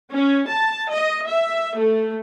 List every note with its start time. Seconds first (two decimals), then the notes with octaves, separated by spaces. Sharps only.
0.12 C#4
0.48 A5
0.90 D#5
1.29 E5
1.77 A3